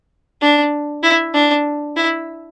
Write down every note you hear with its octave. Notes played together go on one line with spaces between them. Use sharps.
D4
E4
D4
E4